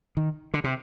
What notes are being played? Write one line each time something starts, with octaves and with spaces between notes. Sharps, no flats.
D#3
D3
C3